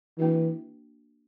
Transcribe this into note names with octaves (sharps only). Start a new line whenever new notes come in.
E3 A#3 D4 F#4